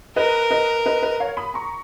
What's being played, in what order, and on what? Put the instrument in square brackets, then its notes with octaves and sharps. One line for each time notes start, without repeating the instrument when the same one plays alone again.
[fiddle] A#4 [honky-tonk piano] B4 D#5
[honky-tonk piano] B4 D#5
B4 D#5
B4 D#5
C#5 F5
B5 D#6
A#5 C#6